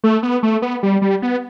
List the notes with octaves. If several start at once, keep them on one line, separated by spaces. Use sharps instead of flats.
A3
B3
A3
B3
G3
G3
B3